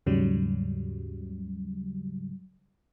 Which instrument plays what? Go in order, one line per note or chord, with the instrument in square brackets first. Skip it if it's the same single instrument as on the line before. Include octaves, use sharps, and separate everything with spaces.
[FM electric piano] D#2 G#2 C#3 F#3 G3